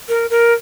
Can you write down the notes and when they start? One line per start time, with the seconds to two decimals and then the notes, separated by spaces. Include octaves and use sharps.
0.09 A#4
0.30 A#4